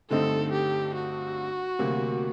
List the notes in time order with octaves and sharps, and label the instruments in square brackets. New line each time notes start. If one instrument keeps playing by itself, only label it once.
[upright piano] G2 D3 A3 C4 D#4 [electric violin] A4
[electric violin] G4
F#4
[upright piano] D2 C3 F#3 A#3